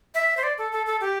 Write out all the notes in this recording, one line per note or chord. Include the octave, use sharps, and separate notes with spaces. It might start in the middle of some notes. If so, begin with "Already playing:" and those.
E5
C5
D5
A4
A4
A4
G4